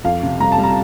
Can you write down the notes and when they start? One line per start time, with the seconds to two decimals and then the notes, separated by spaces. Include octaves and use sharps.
0.04 F2 F5
0.23 C3
0.40 G3 A#5
0.52 A5
0.58 G3
0.64 A#5